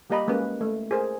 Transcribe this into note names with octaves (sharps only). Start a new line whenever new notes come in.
G3 A#3 G4 D#5 A#5 B5
G#3 A#3 C#4 B4
A3
G#4 A#4 C5